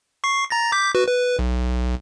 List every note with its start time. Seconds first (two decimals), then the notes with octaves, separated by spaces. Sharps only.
0.24 C#6 C7
0.50 A#5 A6 A#6
0.72 D6 G6 B6
0.95 F#4 B4
1.08 B4
1.39 B1